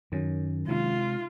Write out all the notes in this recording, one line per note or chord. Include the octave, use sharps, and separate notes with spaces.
F#2 D#3 F#3 C#4
C3 G#3 F4